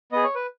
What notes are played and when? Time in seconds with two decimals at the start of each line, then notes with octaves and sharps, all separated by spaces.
0.12 B3 G#4 D#5
0.24 C#5
0.35 B4